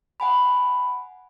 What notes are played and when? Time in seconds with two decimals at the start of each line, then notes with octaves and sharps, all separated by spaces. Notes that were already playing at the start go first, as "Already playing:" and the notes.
0.20 F#5 G#5 B5